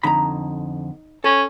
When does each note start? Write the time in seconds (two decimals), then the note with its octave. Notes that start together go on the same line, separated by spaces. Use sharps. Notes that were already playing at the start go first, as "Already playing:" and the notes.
0.03 F2 D3 D#4 A#5 B5
1.24 C#4 A4